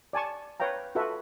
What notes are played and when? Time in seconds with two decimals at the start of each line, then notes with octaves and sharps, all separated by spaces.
0.13 D5 G#5 A5 C#6
0.60 B4 C#5 F5 G5 A#5
0.95 F4 F#4 A4 B4 E5